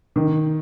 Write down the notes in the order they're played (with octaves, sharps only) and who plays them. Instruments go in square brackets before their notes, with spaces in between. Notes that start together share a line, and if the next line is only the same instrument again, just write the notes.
[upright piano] D#3